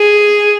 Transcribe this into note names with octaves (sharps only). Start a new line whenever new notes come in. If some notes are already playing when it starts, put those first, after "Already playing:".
Already playing: G#4